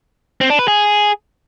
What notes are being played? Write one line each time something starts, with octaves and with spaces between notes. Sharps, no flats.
C4
D4
B4
G#4